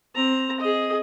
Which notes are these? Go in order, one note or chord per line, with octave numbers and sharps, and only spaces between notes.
C4 A#5
G#4 D#5